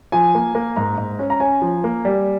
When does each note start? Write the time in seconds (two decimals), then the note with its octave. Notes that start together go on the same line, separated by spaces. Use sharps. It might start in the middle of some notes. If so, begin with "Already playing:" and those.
0.12 F3 G#5
0.35 A#3
0.55 A#3
0.76 G#2 A#5
0.98 G#2
1.19 C#4
1.30 A#5
1.40 C#4 G#5
1.62 F3
1.84 A#3
2.05 G3